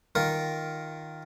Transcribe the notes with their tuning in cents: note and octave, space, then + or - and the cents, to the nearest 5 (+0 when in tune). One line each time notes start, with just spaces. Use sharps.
D#3 +0 F4 +0 A#4 +0